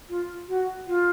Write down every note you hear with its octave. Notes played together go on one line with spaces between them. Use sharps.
F4
F#4
F4